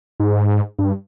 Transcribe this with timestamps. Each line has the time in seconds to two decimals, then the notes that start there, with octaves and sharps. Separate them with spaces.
0.20 G#2
0.79 G2